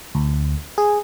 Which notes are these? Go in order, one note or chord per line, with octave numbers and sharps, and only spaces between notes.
D2
G#4